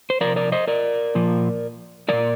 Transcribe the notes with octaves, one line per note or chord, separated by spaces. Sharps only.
C5
C3 F3 A#4 D5
A#4 D5
C5 D#5
A#4 D5
A#2 F3
A#2 F3 A#4 D5